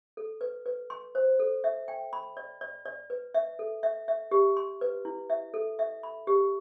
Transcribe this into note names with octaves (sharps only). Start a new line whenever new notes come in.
A4
B4
B4
C6
C5
A4
E5
G5
B5
D5
D5
D5
B4
E5
A4
E5
E5
G4
C6
B4
E4
E5
A4
E5
B5
G4